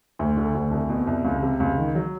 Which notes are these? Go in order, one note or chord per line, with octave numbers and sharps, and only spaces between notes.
D2
D3
D2
C2
B2
C2
C#2
C3
C#2
D#3
F#3